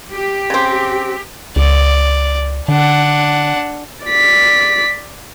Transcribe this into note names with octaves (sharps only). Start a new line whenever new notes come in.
G4
C#3 C4
C#2 D5
D3 D4 F#5
D5 B6